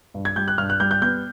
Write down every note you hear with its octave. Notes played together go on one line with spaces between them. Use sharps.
G2
G#6
G3 G6
F#6
G2 F6
F#6
G3 G6
G6
B3 G6